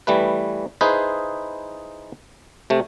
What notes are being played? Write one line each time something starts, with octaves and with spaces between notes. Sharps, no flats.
E3 G3 A3 B4
D#4 E4 G#4 B4 C5
C3 A3